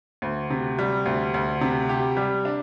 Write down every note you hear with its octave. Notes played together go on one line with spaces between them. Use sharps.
D2
C3
G3
D2
D2
C3
G4
G3
D4